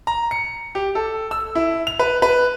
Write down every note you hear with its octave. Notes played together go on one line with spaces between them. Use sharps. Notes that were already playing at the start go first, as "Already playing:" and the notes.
A#5
C#7
G4
A4
E6
E4
F7
B4
B4